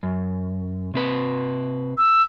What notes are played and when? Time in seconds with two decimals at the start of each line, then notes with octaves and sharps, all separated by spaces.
0.03 F#2
0.94 C3 C4 B4
1.98 E6